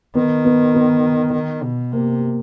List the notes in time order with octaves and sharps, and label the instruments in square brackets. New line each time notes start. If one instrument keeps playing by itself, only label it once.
[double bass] D#3 [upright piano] B3
[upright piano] B3
B3
[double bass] D#3
B2
[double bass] C3 [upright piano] A#3